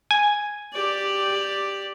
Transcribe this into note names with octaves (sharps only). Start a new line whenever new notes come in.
G#5
G4 D5